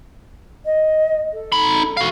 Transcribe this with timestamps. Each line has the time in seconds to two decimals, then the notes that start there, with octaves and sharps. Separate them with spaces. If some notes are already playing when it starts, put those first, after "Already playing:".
0.65 D#5
1.33 A4
1.52 D#4 B5
1.97 F#4 F5